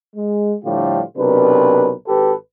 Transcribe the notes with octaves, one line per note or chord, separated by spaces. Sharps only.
G#3
A2 D3 F3 G3 F4 G4
B1 C3 D4 A#4 B4
G#1 G4 A4 B4